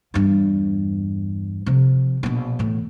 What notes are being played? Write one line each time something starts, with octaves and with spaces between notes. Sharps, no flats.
E2 G2
C3 F3
A#1 B2
E2 A2